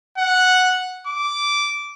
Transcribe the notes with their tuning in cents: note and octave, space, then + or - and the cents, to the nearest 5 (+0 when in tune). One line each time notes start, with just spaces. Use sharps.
F#5 -5
D6 -10